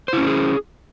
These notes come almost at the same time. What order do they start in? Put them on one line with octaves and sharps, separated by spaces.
C5 E4 C#4 G4 G#4